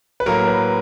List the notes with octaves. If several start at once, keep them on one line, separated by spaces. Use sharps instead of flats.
B4
A2 F#3 A#3 A#4
B4